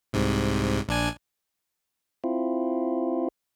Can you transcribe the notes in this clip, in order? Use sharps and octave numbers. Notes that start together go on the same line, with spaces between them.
C2 G#2 C3
A#1 D4 G#5
C4 E4 F4